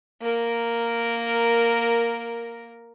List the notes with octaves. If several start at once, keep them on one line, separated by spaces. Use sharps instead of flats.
A#3 A#4